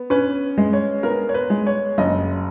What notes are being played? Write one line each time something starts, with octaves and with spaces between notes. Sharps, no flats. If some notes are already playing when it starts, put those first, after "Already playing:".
Already playing: B3
C#4 B4
G#3
C#5
B3 A#4
C#5
B4
G#3
C#5
F#1 D#5